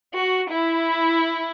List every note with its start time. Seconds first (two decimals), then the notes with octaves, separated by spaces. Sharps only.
0.16 F#4
0.51 E4